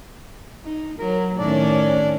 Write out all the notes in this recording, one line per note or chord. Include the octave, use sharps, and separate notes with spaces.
D#4
F#3 A#4
A2 D#3 C#4 D4 D5